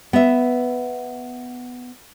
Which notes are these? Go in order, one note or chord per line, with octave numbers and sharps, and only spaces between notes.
B3 E5